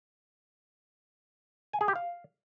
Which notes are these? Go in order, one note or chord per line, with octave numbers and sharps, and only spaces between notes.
G#5
G#4
G4
F5